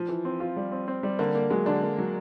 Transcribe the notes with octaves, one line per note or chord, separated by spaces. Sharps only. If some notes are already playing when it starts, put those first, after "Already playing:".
Already playing: F3
E3
C4
F4
G3
C4
C4
G3
D3 A#3
A#3
F#3 G#3
D3 D4
A#3
F#3